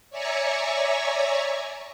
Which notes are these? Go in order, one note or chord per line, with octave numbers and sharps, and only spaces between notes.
C#5 D5 E5 G#5 A#5 C#6